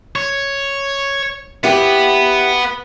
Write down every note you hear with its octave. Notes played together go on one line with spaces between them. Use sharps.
C#5
B3 E4 G4 B4